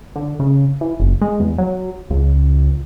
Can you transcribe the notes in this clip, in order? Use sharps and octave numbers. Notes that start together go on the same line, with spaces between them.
D3
C#3
E3
F#1
G#3
E2
F#3
C#2